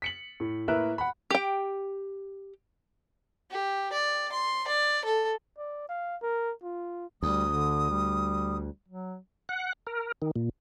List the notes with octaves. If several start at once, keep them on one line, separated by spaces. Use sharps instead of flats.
B6 C#7 F#7
A2
A2 A#3 A#4 B4 E5 F#6
F#5 B5
G4 G5
G4
D5
C6
D5
A4
D5
F5
A#4
F4
D2 G3 D#6
D3
G3
F#3
F#5
A#4
D#3
A#2